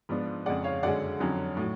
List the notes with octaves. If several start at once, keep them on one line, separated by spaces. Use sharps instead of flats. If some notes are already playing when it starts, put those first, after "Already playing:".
G#2 F3 B3 D4
F2 C#3 G#3 D5 F#5
C#5 F5
F#2 D3 G#3 C#4 D5 F#5
F2 D3 F#3 C#4
A2 F#3